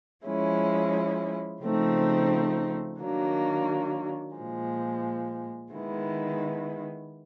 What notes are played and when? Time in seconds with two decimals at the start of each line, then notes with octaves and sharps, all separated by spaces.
0.25 F3 G#3 C#4 E4
1.62 C#3 F3 A3 C4 D#4
2.99 D#3 F#3 A#3 D4
4.36 A#2 F3 G#3
5.72 D#3 G#3 B3 E4